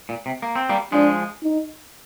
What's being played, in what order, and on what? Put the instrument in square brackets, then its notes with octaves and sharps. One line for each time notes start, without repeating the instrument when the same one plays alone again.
[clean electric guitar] A#2
C3
A#3
C4
G3 A#3
[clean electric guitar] F3 G#3 [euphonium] D4
[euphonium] D#4